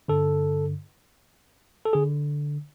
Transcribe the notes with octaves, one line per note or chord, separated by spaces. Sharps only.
G2 D3 A4
A4
D3 G#4